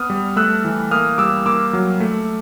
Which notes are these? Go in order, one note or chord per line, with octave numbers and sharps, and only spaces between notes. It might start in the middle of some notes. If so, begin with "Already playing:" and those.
Already playing: B3 D#6 F6
G3
A3 E6 F#6
E3
A#3 D#6 F6
G3 D6 E6
A#3 D6 E6
F#3
A3